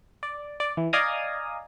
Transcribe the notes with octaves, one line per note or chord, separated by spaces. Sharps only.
D5
D5
E3
D5 D#5 F5 G#5 A#5 D#6